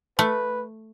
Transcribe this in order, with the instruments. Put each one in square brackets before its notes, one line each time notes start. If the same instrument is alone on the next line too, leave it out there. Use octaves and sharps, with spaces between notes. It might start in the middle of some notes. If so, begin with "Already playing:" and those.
[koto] A3 [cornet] B4